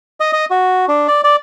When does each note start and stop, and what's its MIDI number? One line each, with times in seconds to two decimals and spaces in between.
0.20 0.32 75
0.33 0.45 75
0.51 0.86 66
0.88 1.07 62
1.08 1.21 74
1.24 1.36 74